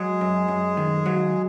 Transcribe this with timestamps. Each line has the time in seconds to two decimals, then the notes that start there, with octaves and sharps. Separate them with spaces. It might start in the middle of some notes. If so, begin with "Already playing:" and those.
Already playing: F#3 G#3 G#4
0.21 F#2
0.48 F#2
0.77 D#3
1.06 F#3